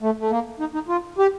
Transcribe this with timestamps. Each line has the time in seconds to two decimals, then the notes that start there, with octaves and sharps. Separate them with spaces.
0.02 A3
0.20 A3
0.31 A#3
0.60 D#4
0.74 D#4
0.88 F4
1.18 G4